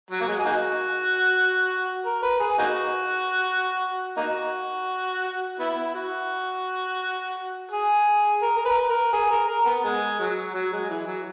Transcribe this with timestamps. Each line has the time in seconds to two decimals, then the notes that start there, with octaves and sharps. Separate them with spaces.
0.11 F#3
0.21 A#3
0.28 G#3
0.39 G#4
0.45 A#3 D#4 F#4
2.05 A#4
2.22 B4
2.40 G#4
2.59 A#3 D#4 F#4
4.17 A#3 D#4 F#4
5.59 B3 E4
5.94 F#4
7.72 G#4
8.42 A#4
8.57 A#4
8.66 B4
8.90 A#4
9.13 G#4
9.31 A#4
9.48 A#4
9.66 B3
9.84 G#3
10.20 F#3
10.54 F#3
10.73 G#3
10.90 E3
11.07 F#3